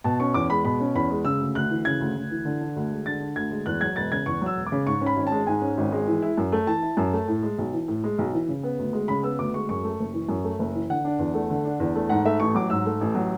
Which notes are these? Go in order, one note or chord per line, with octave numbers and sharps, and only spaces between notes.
B2 A5
C#4 C#6
E2 D6
G#3 B5
B2 B5
C#4
E2 B5
G#3
C#3 E6
D2
D2 F#6
E3
C#3 G#6
D2
D2
E3
D3
D4
D2
G#3
D3 A6
D4
D2 G#6
G#3
E2 F#6
F#3 G#6
E1 A6
C#3 G#6
E2 C#6
F#3 E6
E1
D6
C#3
G#2 C#6
C#4
B5
G#1
A5
G#3
G#2 G#5
C#4
G#1
G#3
E3
E4
F#2
A3
E3 A5
E4
F#2
A3
A2
G#3
B1
E3
A2
G#3
B1
E3
C#3
B3
D2
G#3
C#3 B5
B3 E6
D2 D6
G#3 C#6
F#2 C#6
A3
F#1
E3
F#2
A3
F#1
E3
D3 F#5
D4
E2
A3
D3
D4
E2
A3
G#2 F#5
A3 E5
A1 C#6
F#3 D6
G#2 E6
A3
A1
F#3